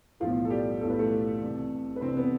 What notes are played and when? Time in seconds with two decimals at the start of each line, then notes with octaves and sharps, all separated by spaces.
0.20 B1 A2 E3 F3 F4
0.45 A4
0.50 G3 G4
0.81 B1 A2 E3 A4
0.90 B4
0.99 A3 A4
1.41 C2 C3 E3
1.96 B4
2.01 C2 C3 E3 C4 C5
2.17 B3 B4